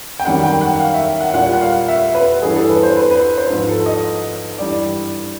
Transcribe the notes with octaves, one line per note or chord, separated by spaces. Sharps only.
G5
F#2 D#3 G3 F#5
G5
F#5
F5
E5
F#5
A#2 G3 F#5
F#5
F5
E5
B4
G2 E3 G3 G#4
A4
B4
C5
B4
B4
C5
G#2 F3 B4
A4
D#5
G2 E3 G3 D5